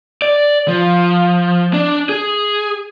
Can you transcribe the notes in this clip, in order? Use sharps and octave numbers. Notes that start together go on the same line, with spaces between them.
D5
F3
D4
G#4